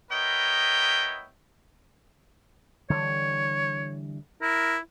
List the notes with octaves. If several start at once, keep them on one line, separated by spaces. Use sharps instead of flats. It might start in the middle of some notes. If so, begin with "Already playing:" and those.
B3 E4 A#4 C#5 D#5 G5
D3 E3 G3 C#5
E4 A#4